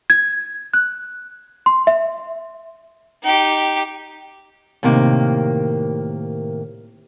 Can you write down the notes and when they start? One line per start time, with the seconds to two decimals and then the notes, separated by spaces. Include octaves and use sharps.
0.10 G#6
0.74 F#6
1.66 C6
1.87 E5
3.23 D#4 G4
4.83 A2 C3 D#3 A#3